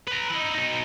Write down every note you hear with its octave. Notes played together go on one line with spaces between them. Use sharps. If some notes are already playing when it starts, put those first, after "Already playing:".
B4 A#5
D#4 E4
B2 D#4